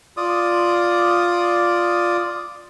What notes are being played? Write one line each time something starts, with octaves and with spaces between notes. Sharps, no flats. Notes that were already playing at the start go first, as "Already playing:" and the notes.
F4 D5 D#6